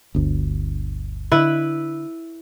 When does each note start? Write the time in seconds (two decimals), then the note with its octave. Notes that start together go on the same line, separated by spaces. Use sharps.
0.15 G1 D2
1.32 D3 E4 B4